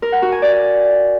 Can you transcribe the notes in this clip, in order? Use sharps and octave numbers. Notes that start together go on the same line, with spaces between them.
A#4
F#5
F#4
G#5
D5